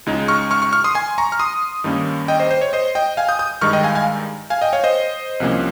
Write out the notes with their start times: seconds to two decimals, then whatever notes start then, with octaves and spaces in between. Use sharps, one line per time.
0.06 C#2 C#3 G#3 D#4
0.28 C#6 F6
0.51 C#6 F6
0.62 C#6 F6
0.72 C#6 F6
0.84 C6 D#6
0.95 G#5 C6
1.18 A#5 C#6
1.32 F6
1.39 C6 D#6
1.84 G2 D#3 A#3 C#4
2.28 D#5 G5
2.40 C5 D#5
2.51 C5
2.61 C#5
2.73 C5 D#5
2.95 D#5 G5
3.17 F5 G#5
3.29 D#6 G6
3.39 D#6 G6
3.61 G2 D#3 G#3 D#4 C#6 F6
3.73 D#5 G5
3.84 F5 G#5
3.95 F5 G#5
4.50 F5 G#5
4.61 D#5 G5
4.73 C#5 F5
4.84 C5 D#5
5.40 C2 C3 F3 A#3 C#4